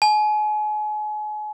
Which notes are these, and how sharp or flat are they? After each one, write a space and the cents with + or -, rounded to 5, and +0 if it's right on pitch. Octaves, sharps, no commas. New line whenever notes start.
G#5 +35